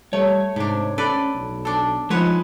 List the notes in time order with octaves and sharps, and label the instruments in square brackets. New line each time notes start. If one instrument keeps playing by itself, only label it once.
[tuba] G3 [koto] A3 [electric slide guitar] C#5
[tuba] G#2 [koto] C3 D4
[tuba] C#4 [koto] A4 B4 D5
[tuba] B1
[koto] D4 A4
[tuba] F3 [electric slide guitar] G#3 D#4 [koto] B4 C#5 F#5